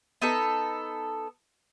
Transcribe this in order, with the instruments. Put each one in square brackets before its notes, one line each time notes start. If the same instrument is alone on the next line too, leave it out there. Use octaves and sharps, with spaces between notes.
[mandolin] B3 D#4 A4